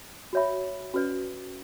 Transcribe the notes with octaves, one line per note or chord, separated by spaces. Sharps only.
F#4 C#5 E5 B5
C#4 F#4 B4 D5